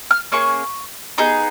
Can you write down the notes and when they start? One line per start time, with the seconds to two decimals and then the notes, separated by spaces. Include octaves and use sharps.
0.11 F6
0.32 A#3 C#4 G#4 C#6
1.18 B3 D#4 G#4